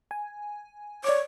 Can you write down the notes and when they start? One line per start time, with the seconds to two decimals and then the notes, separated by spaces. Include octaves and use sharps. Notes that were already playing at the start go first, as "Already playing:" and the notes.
0.11 G#5
1.04 C#5 D5 D6